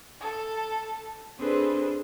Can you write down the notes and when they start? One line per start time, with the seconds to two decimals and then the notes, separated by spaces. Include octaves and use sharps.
0.21 A4
1.38 C4 D4 G#4 A4 B4 C5